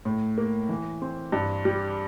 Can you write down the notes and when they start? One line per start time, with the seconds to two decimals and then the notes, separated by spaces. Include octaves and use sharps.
0.05 A2
0.38 A#3
0.69 E3
1.02 C4
1.32 G2
1.65 G3